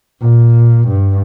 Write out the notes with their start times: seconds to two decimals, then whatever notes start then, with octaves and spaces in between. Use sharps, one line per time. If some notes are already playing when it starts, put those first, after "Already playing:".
0.21 A#2
0.88 G2